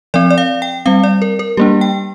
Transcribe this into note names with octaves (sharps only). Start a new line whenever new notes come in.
F3 C4 D5
D5
F5
G5
G3 C4 F5
D5
A#4
A#4
G3 A#3 D4 G4
G5